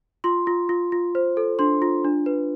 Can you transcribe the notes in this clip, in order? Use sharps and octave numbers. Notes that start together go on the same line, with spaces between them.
F4 C6
F4
F4
F4
C5
A4
D4 C6
F4
D4
B4